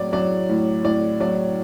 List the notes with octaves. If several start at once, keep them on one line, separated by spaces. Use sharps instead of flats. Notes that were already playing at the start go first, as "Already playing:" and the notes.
Already playing: A2 F#3 D5
F#3 D5
A2
A2 D5
F#3 D5